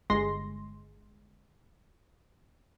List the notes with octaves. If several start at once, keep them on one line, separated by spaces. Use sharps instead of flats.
G1 G#3 C6 A#6